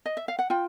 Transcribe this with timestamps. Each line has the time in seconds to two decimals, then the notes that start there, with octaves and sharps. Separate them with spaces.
0.06 D#5
0.17 E5
0.28 F5
0.39 F#5
0.50 F4 G5